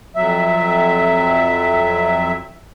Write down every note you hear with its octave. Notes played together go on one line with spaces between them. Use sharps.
F2 F#3 E5